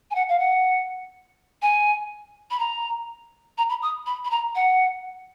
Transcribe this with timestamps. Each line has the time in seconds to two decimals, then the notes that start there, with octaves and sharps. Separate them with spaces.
0.10 G#5
0.15 F#5
0.29 F5
0.39 F#5
1.62 G#5
2.50 B5
2.59 A#5
3.57 A#5
3.69 B5
3.82 D#6
4.06 B5
4.24 B5
4.30 A#5
4.55 F#5